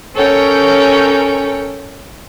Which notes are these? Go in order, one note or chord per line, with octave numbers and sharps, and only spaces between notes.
C#4 A4 A#4 C#5 G5